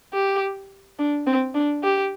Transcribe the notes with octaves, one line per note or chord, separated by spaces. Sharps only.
G4
D4
C4
D4
G4